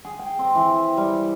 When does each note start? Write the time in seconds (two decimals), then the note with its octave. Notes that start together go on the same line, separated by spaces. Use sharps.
0.05 G#4
0.19 G5
0.39 C4
0.55 E3
0.97 G3